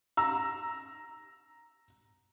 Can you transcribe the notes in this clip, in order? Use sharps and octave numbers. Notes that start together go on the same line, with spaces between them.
A#5 E6